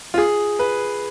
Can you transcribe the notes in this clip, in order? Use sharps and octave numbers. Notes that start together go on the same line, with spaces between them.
F4
G#4
B4